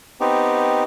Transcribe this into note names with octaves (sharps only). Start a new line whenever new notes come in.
B3 C4 D#4 G4